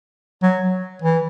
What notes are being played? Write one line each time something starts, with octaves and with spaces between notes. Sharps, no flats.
F#3
E3